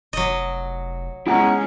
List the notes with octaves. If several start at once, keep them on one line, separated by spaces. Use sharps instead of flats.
F1 F#3 D#5
G#3 B3 C#4 E4 F#5 A#5